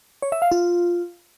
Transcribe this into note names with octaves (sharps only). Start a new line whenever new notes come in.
C#5
E5
F5
F4